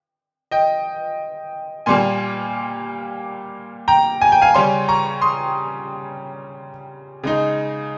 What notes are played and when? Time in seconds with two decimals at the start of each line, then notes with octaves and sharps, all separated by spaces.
0.51 D#5 G5
1.86 A#2 G3 A#3 G#5 C6
3.88 G5 A#5
4.21 G#5
4.32 G5
4.42 F5 G#5
4.54 C#3 G3 C#4 G#5 C6
4.89 A#5 C#6
5.22 C6 D#6
7.24 C#3 G#3 D#4